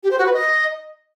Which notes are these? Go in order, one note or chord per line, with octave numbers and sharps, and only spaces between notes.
G4
C5
F#4
B4
D#5